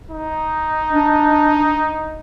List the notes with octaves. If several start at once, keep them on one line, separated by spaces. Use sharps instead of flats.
D#4
D4